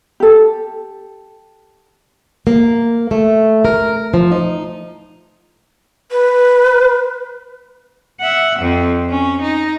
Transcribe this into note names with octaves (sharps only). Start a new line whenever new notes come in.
G4 A4
A#3
A3
A#4
F3
D#4
B4
E5 F#5
F2 C4
C#4
D#4